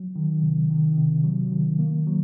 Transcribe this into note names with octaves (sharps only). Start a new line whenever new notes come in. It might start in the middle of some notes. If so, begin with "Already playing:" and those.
Already playing: F#3
D#3
C3
D#3
C3
F#3
D#3
A#3
F#3